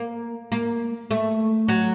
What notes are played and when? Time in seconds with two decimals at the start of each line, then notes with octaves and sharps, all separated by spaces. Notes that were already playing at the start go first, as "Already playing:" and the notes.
Already playing: A#3
0.52 A#3
1.11 A3
1.68 F#3